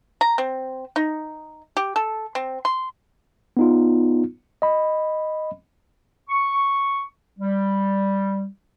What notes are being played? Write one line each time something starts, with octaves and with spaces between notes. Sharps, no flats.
A#5
C4
D#4
G4
A4
C4
C6
B3 D#4 F4
D#5 B5
C#6
G3